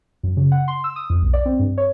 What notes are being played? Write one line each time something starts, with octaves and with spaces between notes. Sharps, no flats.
F#2
C#3
F#5
C6
E6
D#6
F2
B1
D5
C4
G2
C#5